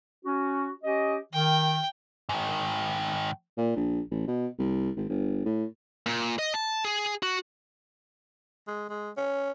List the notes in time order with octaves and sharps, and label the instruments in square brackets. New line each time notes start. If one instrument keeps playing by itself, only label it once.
[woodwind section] C#4 F#4
C#4 G4 D#5
[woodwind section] D#3 [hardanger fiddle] G5
[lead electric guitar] G#2 D#3
[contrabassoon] A#2
A#1
A1
B2
C2
G#1
G1
A2
[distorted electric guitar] A#2
D#5
A5
G#4
F#4
[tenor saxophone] G#3
G#3
C#4